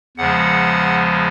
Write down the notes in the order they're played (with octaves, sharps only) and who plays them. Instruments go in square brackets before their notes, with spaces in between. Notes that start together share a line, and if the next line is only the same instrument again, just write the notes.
[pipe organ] E2 C#3 F3 G#3 F#5